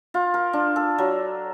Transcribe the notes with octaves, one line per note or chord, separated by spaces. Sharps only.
F4
A#4
D4
A4
F#3